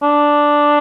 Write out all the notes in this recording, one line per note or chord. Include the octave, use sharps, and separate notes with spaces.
D4